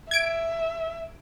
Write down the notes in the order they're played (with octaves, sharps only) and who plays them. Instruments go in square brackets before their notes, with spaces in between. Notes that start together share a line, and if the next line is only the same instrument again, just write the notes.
[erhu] E5 [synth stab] G#6 D7